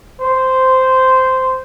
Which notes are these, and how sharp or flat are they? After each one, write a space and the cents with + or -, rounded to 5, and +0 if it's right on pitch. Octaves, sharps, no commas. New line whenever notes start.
C5 -10